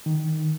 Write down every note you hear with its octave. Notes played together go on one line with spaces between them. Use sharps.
D#3